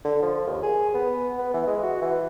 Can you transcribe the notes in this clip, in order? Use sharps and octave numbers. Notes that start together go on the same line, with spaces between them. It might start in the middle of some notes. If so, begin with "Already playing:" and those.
D3
F3
D#2
G#4
B3
B3
E3
G#3
F#4
E3